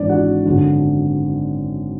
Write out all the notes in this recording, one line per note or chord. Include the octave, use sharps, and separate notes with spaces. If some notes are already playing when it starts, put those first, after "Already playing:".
Already playing: G#1 G#2 E3 D4 D5
F#4 F#5
G#1 F#2 D3